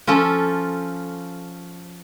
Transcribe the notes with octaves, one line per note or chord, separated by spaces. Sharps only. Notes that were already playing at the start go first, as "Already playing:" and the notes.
F3 C#4 F4 A4